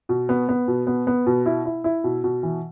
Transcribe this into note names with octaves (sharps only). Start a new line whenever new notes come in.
B2
B3
B3
B2
B3
B3
B2
E4
E4
E4
B2
B2
E3